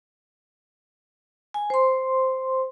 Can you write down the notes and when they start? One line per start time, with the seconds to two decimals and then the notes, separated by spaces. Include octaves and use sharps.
1.54 G#5
1.70 C5 C6